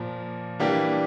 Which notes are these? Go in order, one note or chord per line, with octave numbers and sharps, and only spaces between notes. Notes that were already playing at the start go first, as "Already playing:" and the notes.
Already playing: A#2 F3 A#3
E3 G3 A#3 D4 G4